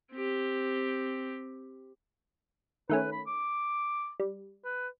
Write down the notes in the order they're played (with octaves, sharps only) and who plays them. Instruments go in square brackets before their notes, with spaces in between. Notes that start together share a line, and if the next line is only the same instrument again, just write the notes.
[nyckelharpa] C4 G4
[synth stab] D#3 A3 C#4 [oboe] B4
[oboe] B5
D6
[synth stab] G3
[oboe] B4